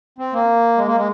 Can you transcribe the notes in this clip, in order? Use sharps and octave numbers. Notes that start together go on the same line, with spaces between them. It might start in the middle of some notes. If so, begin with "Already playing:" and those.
C4
A#3
G#3
A#3
G#3